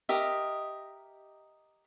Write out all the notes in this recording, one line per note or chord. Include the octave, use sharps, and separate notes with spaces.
G4 A#4 D#5 E5